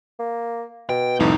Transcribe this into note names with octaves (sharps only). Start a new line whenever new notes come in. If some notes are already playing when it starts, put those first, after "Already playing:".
A#3
B2 G5
C2 F2 A2 D#4